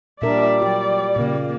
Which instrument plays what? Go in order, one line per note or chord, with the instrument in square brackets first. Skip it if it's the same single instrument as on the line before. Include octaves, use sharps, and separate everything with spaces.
[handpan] A#2 A#4 [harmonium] G3 [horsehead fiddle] D4 E5 [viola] D5
[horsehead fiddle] F#3 [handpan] G4
[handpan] A#2 C#3 [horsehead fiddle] A#3